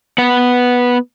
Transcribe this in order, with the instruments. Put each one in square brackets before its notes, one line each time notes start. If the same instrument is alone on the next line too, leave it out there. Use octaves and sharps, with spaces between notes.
[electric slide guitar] B3 F#5